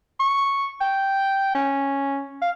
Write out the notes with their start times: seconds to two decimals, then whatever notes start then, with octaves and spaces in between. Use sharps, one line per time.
0.20 C#6
0.81 G5
1.55 C#4
2.42 F5